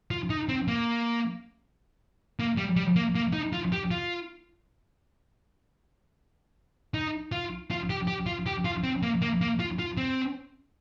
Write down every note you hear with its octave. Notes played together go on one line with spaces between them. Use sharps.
F4
D#4
C4
A#3
A#3
G3
G3
A#3
A#3
D#4
F4
G4
F4
D#4
F4
F4
G4
G4
F4
G4
F4
C4
A#3
A#3
A#3
F4
F4
C4